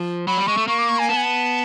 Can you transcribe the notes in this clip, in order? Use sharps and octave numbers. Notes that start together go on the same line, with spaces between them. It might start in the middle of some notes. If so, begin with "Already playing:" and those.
Already playing: F3
F#3 B5
G3
G#3 C#6
A3
A#3 C#6
D6
C#6
G#5
B3 A5
G#5
A5